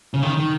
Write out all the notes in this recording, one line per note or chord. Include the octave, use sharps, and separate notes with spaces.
C#3
D#3
D#3